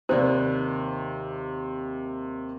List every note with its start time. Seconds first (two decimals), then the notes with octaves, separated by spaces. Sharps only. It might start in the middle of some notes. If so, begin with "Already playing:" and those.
0.09 D#2 C3 C5 D5 F#6